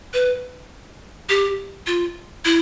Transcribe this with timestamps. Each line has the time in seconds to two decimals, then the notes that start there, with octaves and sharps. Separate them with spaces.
0.13 B4
1.29 G4
1.87 F4
2.45 E4